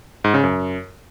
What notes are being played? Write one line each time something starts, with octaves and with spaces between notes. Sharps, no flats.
G#2
C#3
F#2